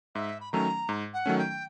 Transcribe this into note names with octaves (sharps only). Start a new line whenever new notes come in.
G#2 E5
B5
D#3 F#3 A3 C#4 A#5
G#2
F#5
D#3 F#3 A3 C#4
G5